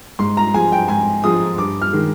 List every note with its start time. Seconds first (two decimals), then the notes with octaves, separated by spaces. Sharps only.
0.19 G#2 C6
0.37 A#5
0.54 F3 G#3 G#5
0.72 G5
0.88 G#2 G#5
1.24 F3 G#3 D#6
1.58 G2 D6
1.82 F6
1.93 D#3 G#3